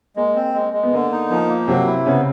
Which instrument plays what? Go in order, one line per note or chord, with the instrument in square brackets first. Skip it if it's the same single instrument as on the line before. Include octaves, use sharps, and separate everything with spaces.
[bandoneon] G#3 [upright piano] A#3
[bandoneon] C4
G#3
G#3
[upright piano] B3
[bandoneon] D3 [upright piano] A#3
[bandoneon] D#4
[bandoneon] F3 [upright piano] A#3
[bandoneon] A#3
[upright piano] C3 C4 [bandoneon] F#3
[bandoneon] E4
[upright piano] C#3 C#4 [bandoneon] B3